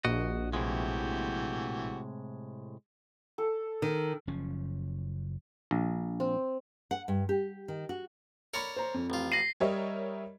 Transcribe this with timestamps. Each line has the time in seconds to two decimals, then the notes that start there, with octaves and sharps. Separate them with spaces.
0.05 A#1 F#4 D#5
0.53 A2 C3 E3 G#3 F#4 G4
3.38 A4
3.82 D#3
4.27 F#1 F3 C#4
5.71 A#1
6.20 C4
6.91 F#5
7.08 G2
7.29 G4
7.68 D#3
7.89 F#4
8.54 A#4 C#5 D5 B5 C#7
8.76 C5 A#5
8.94 F2
9.10 A1 F4
9.32 A#6 C7 D#7 F#7
9.60 G3 G4 A#4 C#5 D#5 E5